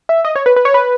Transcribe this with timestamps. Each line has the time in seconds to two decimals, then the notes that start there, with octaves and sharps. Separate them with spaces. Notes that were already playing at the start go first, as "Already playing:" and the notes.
0.09 E5
0.25 D#5
0.36 C#5
0.46 B4
0.56 B4
0.65 C#5
0.74 B4